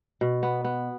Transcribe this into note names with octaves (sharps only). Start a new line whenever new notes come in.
B2
B3
B3